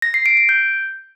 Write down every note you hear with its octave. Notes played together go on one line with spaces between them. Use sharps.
A#6
C7
D7
D7
G6